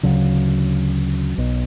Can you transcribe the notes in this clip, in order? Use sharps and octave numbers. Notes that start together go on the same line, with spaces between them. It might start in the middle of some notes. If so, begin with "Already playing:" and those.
D2 C#3 F#3
B1 B2